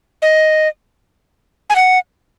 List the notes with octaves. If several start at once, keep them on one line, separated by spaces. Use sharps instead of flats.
D#5
G#5
F#5